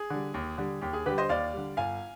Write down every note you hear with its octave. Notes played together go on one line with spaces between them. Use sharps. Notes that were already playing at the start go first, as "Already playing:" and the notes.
Already playing: G#4
D3 G3
D#2
D3 G3
D#2 G4
G#4
D3 G3 G4 B4
C5 D#5
D#2 D5 F5
D3 G3
G1 F5 G#5